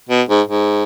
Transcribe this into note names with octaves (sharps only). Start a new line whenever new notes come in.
B2
G#2
G#2